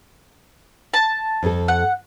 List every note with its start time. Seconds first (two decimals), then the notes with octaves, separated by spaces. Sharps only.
0.94 A5
1.43 F2 A4
1.68 F#5